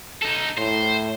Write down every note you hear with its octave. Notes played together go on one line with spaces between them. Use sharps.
D#4 A4
A2 C5